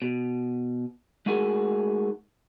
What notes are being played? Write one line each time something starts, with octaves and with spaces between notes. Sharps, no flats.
B2
G#3 A3 D#4 F#4 G#4 A#4